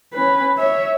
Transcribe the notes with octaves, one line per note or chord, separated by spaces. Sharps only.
C#4 B4
C#5 E5